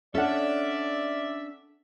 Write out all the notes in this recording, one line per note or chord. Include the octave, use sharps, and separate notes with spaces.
C#4 D4 A4 D5 E5 F#5